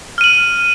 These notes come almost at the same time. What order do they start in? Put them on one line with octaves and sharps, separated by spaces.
F6 D#7 F#7